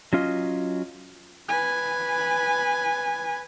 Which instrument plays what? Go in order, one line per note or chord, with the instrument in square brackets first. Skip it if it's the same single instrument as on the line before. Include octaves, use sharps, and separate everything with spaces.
[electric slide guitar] F#3 C#4 F4 D#5
[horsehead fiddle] B4 G#5